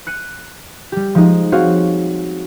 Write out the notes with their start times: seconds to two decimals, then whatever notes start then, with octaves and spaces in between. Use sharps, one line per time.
0.07 F#6 C#7 D#7
0.92 G3 G4
1.15 F3 G#3 D#4
1.52 C4 F#4 G#4 C#5 F5